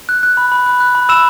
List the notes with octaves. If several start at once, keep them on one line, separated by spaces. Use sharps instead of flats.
F#6
F#6
B5
B5
F#6
F#6
B5
B5 E6 E7